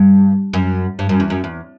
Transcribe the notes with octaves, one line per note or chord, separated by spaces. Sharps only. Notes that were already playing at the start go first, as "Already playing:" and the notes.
Already playing: G2
F#2
G2
F#2
E2
F#2
E2